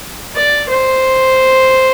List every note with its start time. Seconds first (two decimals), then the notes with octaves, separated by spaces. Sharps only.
0.36 D5
0.69 C5